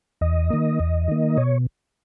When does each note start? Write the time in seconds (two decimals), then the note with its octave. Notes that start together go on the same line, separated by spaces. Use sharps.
0.21 E2 D#5
0.50 D#3 A#3
0.80 E2
1.08 D#3 A#3
1.37 B2 C#5